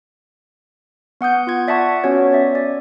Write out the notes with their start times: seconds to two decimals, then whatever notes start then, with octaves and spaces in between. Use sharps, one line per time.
1.21 B3 F#5 D#6 G6
1.47 F4 G#6
1.68 D5 E5 F#5 A5 C#6
2.04 B3 C#4 F#4 C#5
2.32 D5 E5
2.55 D5